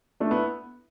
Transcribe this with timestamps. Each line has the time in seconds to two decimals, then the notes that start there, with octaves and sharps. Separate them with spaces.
0.20 A3 D4
0.31 B3 E4